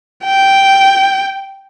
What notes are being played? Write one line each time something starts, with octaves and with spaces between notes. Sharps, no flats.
G5